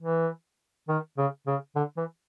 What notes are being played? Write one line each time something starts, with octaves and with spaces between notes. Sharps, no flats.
E3
D#3
C#3
C#3
D3
E3